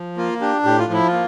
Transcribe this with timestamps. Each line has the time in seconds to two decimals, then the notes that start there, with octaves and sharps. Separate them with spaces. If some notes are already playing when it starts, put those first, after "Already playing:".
Already playing: F3
0.17 A#3 F4
0.41 D4 G4
0.64 A2 G4
0.78 F4
0.89 F3 E4
1.07 F4
1.12 A#3